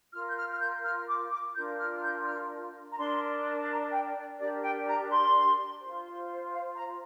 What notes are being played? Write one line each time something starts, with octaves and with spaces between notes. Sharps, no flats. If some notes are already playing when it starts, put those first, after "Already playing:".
F4 A#4 F6
G6
F6
F6
G6
F6
D6
D6
D4 F4 A#4 G6
F6
F6
G6
F6
A#5
D4 A#4 C6
A#5
G5
D5
D4 G4 A#4 D5
G5
A#5
C6
F4 C5
F5
A#5